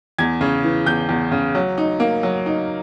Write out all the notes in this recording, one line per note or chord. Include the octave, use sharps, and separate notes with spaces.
E2 G#6
C#3
E3
E2 G6
E2
C#3
F#3
D#4
A#3
F#3
D#4